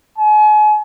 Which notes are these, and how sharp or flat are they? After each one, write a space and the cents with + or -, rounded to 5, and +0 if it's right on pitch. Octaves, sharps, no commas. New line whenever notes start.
G#5 +40